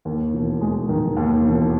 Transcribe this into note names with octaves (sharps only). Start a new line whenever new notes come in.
D#2
E1
G#3
D#3
D#2
E1